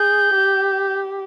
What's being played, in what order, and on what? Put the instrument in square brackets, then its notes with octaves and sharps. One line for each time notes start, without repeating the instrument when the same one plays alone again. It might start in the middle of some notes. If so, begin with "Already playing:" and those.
Already playing: [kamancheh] G#4 [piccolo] G6
[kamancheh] G4